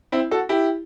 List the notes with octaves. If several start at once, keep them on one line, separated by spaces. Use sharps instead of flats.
C4 E4
F#4 A4
E4 G4